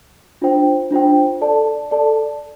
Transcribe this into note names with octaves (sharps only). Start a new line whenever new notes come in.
D4 F4 C5 G5
D4 F4 C5 G5
A4 D5 A5
A4 D5 A5